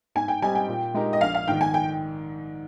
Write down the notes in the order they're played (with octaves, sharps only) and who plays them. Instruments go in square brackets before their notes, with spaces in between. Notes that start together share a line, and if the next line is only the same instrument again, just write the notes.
[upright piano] G#2 [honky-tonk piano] G#5
[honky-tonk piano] G5
[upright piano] G3 C4 D#4 G4 [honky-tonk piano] G#5
[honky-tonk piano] G5
[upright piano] A#2
G#3 D#4 G4 A#4
[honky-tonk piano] D#5
[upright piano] A#1 [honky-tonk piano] F5
[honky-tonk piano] F5
[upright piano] G#2 D#3 [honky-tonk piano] G5
[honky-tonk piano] G#5
G5